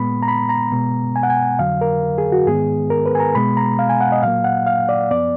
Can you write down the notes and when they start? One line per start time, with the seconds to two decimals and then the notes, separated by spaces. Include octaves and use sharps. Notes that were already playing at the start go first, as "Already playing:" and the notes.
Already playing: A#2 G#3 B3 B5
0.23 A#5
0.28 B5
0.49 A#5
0.72 B2 G#3 B3
1.16 G#5
1.23 F#5
1.30 G#5
1.59 F2 D3 F#3 F5
1.81 A#4
2.18 G#4
2.32 F#4
2.47 G#2 D#3 G#3 B3 G#4
2.90 A#4
3.06 B4
3.15 G#5
3.20 A#5
3.35 B2 G#3 B3 B5
3.57 A#5
3.79 F5
3.89 G#5
4.01 F#5
4.12 D#5
4.23 A#2 F#3 A#3 F5
4.44 F#5
4.66 F5
4.89 D5
5.10 F#2 F3 B3 D5